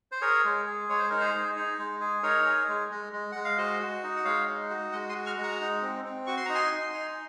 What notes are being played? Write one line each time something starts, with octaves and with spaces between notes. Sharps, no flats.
C5
G#4 A#4 C#5
G#3
G#4
G#3 C#5
C5
D#4 A#4
G#4 C5
G#4
D#4
G#3
G#4
D#4 A#4 C#5
G#4
G#3
G#3
G#3
G#3 F#5
F5
F#4 C5 D#5
F#4
D#4
F#5
G#3 C#5 F5
D#4
F#4
G#3 D#5 F#5
C6 D#6
F#4
C#6 F6
G#3
F#5 A#5
D#4
C4
C4
F#4 C#6
C6
D#4 A#5
G#5 C6
D#4
D#4